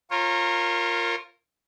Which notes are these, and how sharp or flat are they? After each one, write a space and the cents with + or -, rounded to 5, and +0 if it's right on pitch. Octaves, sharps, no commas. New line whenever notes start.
F4 +0 A#4 -10 C#5 -35